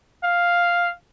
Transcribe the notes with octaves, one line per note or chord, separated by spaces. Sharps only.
F5